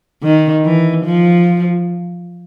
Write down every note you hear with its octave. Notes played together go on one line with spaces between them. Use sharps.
D#3
E3
F3